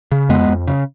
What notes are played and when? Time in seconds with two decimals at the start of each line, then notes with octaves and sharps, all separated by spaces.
0.12 C#3
0.29 F2 G#3 B3
0.49 F2
0.68 C#3